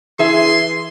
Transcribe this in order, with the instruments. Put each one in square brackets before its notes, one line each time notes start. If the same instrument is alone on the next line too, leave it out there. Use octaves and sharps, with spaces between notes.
[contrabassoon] E3 [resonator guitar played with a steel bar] G#4 E5 [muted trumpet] C6